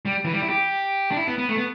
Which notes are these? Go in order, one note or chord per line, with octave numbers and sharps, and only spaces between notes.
G3
E3
G3
E4
G4
D4
E4
B3
B3
A3
B3